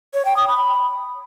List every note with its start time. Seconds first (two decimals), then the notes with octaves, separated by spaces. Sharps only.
0.14 C#5
0.25 G5
0.36 D#6
0.48 B5